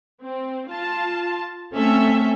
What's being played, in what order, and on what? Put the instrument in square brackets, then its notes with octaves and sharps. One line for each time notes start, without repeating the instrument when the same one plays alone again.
[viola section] C4
F4 A5
[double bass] A3 C4 [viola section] C#4 A4 E5